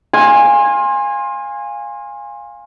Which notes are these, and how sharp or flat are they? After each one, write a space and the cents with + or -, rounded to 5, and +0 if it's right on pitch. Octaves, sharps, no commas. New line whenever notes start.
F5 +10 G#5 -20 C6 +25